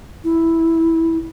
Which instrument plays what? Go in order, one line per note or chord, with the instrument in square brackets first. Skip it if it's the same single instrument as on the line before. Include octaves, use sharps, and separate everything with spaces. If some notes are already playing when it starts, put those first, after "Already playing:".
[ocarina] E4